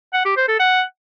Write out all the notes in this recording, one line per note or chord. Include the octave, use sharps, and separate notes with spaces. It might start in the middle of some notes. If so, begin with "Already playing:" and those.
F#5
G4
C5
A4
F#5